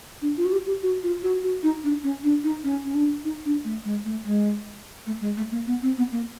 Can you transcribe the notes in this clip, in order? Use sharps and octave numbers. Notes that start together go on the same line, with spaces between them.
D4
F4
F#4
G4
G4
F#4
F4
F#4
F#4
D#4
D4
C#4
D4
D#4
C#4
C#4
D4
D#4
D4
A3
G#3
A3
G#3
A3
G#3
A3
A#3
B3
C4
B3
A#3